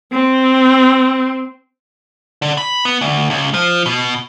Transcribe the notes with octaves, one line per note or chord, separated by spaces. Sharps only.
C4
D3
B5
B3
D2
C#2
F3
B2